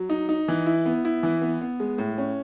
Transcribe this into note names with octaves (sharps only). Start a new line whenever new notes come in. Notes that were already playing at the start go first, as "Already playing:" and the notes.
Already playing: F#3
D#4
D#4
E3
E4
B3
E4
E3
B3
B3
G#3
A2
C#4